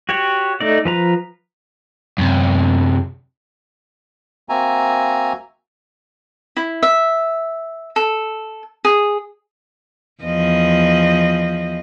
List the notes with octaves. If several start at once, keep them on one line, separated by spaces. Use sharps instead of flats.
F#4 G4 C#5
A3 D#4 D5
F3 B4 A#5
F#2 C3
A#3 C4 F#4 E5 G#5 A#5
E4
E5
A4
G#4
E2 F3 D#5